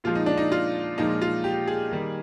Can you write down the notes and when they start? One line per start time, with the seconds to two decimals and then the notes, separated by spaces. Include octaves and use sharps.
0.04 A#2 F3 G#3 F4
0.15 D#4
0.26 D4
0.37 D#4
0.52 F4
0.98 A#2 F3 G#3 D#4
1.22 F4
1.44 G4
1.68 G#4
1.92 D#3 G3 A#3